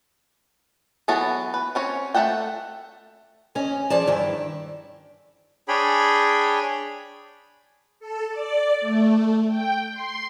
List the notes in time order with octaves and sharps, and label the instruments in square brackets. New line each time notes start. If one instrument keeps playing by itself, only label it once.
[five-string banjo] E3 F#3 B3 F#4 A4
B4
C4 C#4 C#5
A3 D#4 A4 F#5 G5
[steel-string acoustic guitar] F2 C#4 D#5 G#5
F3 G#4 D5 A5
G2 D#3 E4 G5
[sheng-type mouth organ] D4 G#4 C#5 G5 B5
[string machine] A4
D5
A3
G5
C6